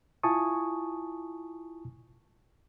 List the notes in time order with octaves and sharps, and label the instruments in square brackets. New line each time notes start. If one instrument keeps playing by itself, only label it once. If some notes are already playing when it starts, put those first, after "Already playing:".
[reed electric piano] E4 F4 G#5 A5 C#6 D#6